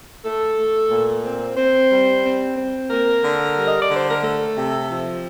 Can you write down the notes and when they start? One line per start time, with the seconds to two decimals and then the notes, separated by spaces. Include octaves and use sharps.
0.24 A3 A4
0.57 A3
0.91 A#2
1.24 C4
1.56 C4 C5
1.90 G3
2.23 C4
2.57 C4
2.90 A#3 A#4
3.23 D3
3.57 G3
3.67 D#5
3.81 D5
3.90 D3
3.95 C5
4.09 A#4
4.23 A3 A4
4.56 C3
4.90 F3